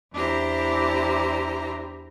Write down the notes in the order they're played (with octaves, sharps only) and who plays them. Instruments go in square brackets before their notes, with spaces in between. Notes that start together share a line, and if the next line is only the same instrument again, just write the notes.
[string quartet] E2 D4 E4 G4 C5 A#5